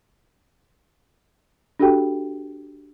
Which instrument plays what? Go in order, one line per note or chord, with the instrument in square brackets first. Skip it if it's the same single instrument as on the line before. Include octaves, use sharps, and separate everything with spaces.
[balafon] D4 F#4 G4 A4 G5